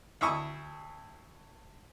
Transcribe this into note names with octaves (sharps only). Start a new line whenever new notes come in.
D2 E4 E5 C#6 D#6